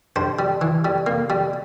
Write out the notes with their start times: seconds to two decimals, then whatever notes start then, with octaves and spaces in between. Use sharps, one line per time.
0.16 G2 C5
0.39 G3
0.61 E3
0.85 G3
1.07 A#3
1.30 G3